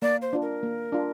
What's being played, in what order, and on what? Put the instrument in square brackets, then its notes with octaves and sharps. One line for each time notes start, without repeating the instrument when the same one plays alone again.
[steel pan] A#3 [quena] D5
[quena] C5
[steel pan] D4 F4
[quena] A#4
[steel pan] A#3
D4 F4